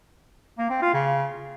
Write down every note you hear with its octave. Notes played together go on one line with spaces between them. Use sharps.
A#3
C4
F4
C#3